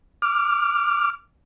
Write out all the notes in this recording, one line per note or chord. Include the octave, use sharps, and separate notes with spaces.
D6 F6